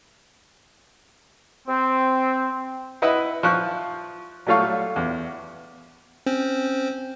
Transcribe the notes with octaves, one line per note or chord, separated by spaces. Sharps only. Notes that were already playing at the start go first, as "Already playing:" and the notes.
C4
E4 B4 D#5 F#5 B5
F3 F4 C#6 F#6
F#3 G3 A3 F4 C#5 F5
E2
C4 C#4 C5